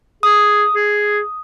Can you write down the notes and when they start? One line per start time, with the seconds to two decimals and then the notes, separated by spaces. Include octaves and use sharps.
0.23 G#4 D#6
0.75 G#4